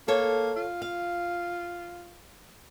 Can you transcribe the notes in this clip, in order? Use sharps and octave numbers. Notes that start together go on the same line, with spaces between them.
A#3 A4 C#5
F4
F5